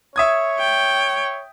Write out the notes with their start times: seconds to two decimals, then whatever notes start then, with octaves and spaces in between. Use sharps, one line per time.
0.16 C#5 E5 D#6 G#6
0.59 G5